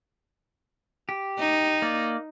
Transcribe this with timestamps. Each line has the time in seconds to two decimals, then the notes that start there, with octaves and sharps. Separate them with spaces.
1.09 G4
1.40 D#4
1.82 A#3 D5